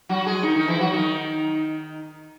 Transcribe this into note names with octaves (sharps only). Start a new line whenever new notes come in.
F#3 F#4
G#3 G#4
D#3 D#4
D#3 D#4
E3 E4
F#3 F#4
D#3 D#4